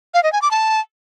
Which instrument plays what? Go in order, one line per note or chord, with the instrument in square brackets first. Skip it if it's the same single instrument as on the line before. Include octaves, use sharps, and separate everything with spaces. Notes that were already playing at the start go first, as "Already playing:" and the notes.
[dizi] F5
D#5
G#5
D6
A5